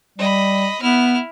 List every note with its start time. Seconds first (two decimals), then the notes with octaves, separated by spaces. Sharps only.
0.18 G3 D#5 B5
0.82 B3 E4 F6